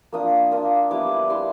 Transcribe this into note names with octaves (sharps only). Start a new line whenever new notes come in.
A#3 D4 F4 D#6
A#3 D4 F4 D#6
G3 B3 E4 D6
G3 B3 E4 C6